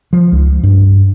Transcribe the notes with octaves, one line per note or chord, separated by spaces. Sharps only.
F3
C#2
G2